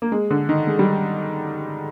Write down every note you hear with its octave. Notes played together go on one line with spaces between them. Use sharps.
A#3
G#3
D3
D#3
G#3
G3